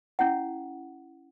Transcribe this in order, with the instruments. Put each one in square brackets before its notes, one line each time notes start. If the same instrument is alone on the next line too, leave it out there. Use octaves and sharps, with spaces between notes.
[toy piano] C#4 E4 F#5